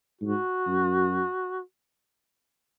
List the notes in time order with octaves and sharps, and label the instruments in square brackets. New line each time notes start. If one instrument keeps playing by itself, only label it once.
[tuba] G#2 [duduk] F#4
[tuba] F#2